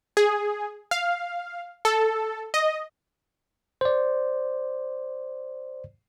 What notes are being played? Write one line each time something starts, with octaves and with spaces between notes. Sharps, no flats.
G#4
F5
A4
D#5
C5 D5